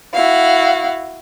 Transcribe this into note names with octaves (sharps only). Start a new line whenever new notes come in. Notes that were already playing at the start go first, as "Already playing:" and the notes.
E4 F#4 F5